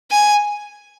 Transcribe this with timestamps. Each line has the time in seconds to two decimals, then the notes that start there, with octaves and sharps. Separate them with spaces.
0.11 G#5